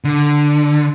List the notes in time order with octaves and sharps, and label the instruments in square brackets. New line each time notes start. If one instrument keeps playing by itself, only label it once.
[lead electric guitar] D3